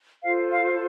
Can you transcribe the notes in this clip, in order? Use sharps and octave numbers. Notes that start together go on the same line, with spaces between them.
F4 A4 C5 F5
F5